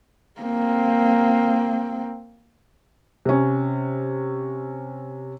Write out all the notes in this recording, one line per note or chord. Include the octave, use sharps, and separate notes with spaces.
A#3 C4
C3 C#4